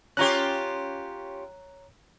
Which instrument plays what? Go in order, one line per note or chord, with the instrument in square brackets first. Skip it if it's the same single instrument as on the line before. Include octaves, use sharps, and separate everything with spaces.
[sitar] C#4 F4 G4 [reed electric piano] C#5 A#5 F#6